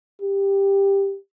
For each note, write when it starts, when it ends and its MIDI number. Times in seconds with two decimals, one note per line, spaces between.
0.22 1.16 67